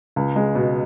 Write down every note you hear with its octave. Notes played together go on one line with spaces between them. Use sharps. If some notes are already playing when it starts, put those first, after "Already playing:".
C#2
G#3
B2